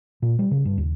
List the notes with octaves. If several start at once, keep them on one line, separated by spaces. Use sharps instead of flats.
A#2
G3
C#3
G2
D#2